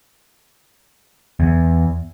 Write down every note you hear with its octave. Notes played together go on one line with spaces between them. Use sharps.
E2